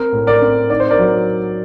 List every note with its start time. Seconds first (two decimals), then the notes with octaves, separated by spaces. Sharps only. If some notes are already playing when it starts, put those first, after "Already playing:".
Already playing: C4 A#4
0.12 A2
0.27 A#4 D5
0.42 C4
0.70 D#4 D5
0.80 C5
0.90 A#4 D5
0.99 F#3